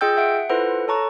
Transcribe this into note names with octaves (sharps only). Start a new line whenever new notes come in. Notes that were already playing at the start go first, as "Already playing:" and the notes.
F4 G#4 D#5 G5 E6 G6
E5 F#5 D7
E4 F4 A4 B4 C5 F#5
A4 C#5 A5 A#5 C#6 F#6